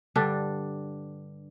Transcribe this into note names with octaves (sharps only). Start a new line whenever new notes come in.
G2 D3 G3 D4